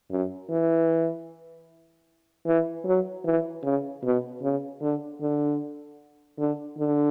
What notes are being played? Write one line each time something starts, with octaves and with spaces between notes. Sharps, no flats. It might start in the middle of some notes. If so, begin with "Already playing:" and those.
F#2
E3
E3
F#3
E3
C#3
B2
C#3
D3
D3
D3
D3